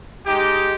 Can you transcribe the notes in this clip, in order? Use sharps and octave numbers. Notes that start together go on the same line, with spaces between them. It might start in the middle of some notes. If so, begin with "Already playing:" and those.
G#3 D#4 G4